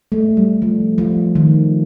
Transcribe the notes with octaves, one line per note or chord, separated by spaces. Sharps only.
A3
G3
F3
F3
D#3